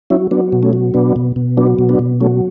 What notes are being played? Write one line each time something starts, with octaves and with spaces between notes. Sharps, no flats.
F#3 C#4 E4
F#3 B3 D4
B2
A3 C#4
F#3
B2 B3 D4
B2
B2
F#3 B3 D4
B2
B3 D4
B2
F#3 A3 C#4